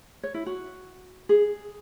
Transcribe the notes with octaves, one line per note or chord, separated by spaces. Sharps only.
C#5
E4
F#4
G#4